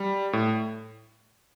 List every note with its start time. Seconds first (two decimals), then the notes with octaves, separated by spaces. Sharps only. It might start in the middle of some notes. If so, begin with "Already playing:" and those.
Already playing: G3
0.33 A2